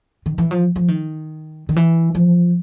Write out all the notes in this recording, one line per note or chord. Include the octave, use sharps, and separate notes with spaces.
D#3
E3
F3
F3
D#3
D#3
E3
F3